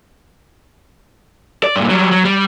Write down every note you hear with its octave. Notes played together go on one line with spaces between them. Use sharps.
D5
G2 A#2
F#3 G3
F#3
G3